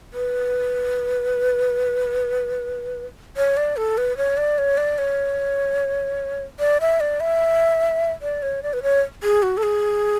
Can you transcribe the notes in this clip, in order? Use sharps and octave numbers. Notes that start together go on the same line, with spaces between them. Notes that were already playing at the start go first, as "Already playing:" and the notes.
B4
C#5
D5
A4
B4
C#5
D5
C#5
D5
C#5
D5
E5
D5
E5
D5
C#5
D5
B4
C#5
G#4
F#4
A4
G#4